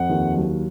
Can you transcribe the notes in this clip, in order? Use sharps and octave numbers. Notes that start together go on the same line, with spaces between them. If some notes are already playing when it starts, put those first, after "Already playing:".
Already playing: F2 F#5
D#2
F#3